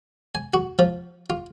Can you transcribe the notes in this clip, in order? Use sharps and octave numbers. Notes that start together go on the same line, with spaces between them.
G#5
F#4
F3
F4